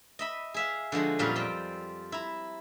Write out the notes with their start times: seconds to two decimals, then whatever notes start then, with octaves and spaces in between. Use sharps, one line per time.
0.19 D#5 E5 B5
0.54 G#4 E5 F5
0.92 D3 F3 G#3 F#4
1.19 F2 A#2 F#3 G3 C#4 F4
1.36 C4 G5
2.12 E4 A#5